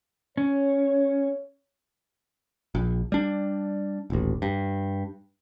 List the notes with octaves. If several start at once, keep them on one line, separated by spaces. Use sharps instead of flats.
C#4 C#5
A#1
G3 D4
D#1 A1
G2